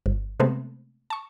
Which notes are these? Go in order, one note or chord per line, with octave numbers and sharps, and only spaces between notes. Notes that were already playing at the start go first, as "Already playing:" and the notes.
G1
C3 G#3 A3 B3 C4
A5 C#6